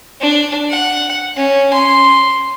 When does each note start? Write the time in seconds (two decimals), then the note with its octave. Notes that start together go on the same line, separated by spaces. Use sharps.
0.21 D4
0.70 F#5
1.37 C#4
1.73 C6